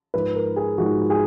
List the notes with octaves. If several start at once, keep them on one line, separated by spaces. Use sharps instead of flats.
G#2 F3 B4
A#4
G#4
G#2 F3 F#4
G#4